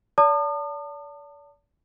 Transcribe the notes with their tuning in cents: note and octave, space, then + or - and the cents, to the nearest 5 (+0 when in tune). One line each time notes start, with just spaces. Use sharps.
D5 -40 A5 +30 D#6 -45